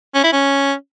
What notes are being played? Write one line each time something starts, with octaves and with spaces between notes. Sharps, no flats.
C#4
E4
C#4